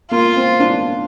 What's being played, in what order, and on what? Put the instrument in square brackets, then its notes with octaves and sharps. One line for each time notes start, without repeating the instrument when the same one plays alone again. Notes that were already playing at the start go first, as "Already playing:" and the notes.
[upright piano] A#3 [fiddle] F4
[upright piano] C4
D4